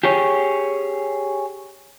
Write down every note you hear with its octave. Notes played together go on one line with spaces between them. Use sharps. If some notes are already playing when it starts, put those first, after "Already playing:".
G4 G#4 C#5